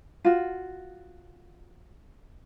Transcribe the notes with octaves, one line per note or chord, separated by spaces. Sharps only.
F4 F#4